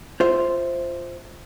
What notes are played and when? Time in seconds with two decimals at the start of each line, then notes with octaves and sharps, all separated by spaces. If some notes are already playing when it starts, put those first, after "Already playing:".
0.20 F4 C5 E5